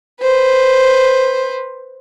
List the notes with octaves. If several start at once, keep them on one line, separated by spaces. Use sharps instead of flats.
B4 C5